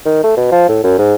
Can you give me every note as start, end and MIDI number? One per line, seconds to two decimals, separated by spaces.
0.06 0.20 51
0.24 0.33 57
0.37 0.48 47
0.52 0.68 53
0.69 0.83 45
0.84 0.96 42
0.99 1.14 44